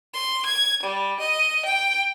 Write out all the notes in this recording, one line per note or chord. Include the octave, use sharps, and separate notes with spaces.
C6
G#6
G3
D#5
G5